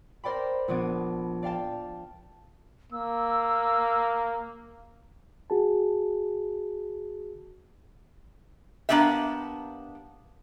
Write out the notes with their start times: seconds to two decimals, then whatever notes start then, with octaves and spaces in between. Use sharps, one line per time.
0.24 A#4 C5 D5 G5 B5
0.68 A#1 F3 B3 D4 G#6 D7
1.43 D5 F5 G5 A5
2.92 A#3 E6
5.50 F#4 G#4 A5
8.89 A#3 B3 D4 G4 E5